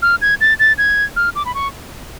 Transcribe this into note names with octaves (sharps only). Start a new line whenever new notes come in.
F6
G#6
A6
A6
G#6
F6
D6
B5
C#6